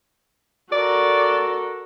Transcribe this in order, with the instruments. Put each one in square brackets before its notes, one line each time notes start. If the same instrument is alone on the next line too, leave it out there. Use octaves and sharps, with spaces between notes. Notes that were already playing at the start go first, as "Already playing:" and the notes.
[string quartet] F#4 A4 A#4 [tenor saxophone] D5